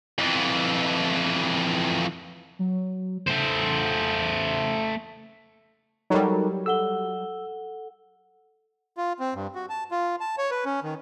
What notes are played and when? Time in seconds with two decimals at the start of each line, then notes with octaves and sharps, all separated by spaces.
0.18 F2 E3
2.59 F#3
3.27 A3 C5
6.10 F#3 G3 D#4 A4 A#4
6.66 A4 F#5 E6 G7
8.97 F4
9.20 C4
9.34 G2
9.55 F#4
9.70 A5
9.91 F4
10.20 A5
10.38 C#5
10.51 B4
10.65 C#4
10.83 D#3